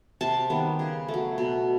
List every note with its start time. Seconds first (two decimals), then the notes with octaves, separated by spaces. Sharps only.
0.21 C3 A5
0.50 D#3 G3 B3
0.79 C#3
1.08 A3
1.14 F#3
1.38 B2